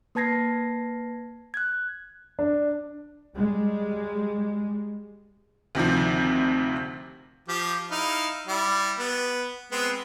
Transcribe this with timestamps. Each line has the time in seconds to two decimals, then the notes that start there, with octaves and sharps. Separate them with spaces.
0.15 A#3 B4 A5 G#6 A#6 C7
1.54 F#6 G#6
2.39 D4
3.35 G3 G#3
5.75 D2 C3 D#3 F3
7.48 F3 G4
7.91 D#4 E4 F5
8.47 G3 E4
8.99 B3
9.72 G#3 B3 C4